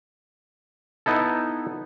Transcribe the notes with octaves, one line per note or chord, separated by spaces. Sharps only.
B3 D#4 E4 A4